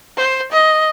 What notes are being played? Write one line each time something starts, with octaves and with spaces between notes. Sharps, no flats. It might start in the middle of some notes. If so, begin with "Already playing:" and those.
C5
D#5